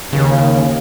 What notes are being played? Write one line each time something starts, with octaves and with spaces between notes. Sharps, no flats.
D#2 C#3